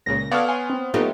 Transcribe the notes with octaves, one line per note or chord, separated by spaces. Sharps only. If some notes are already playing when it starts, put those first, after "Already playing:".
C#2 A#2 C#3 A#6
B3 A4 C#5 D5 F5 F6
C#5 G#5 C6
C4
F#3 A3 B3 D#4 F4 G4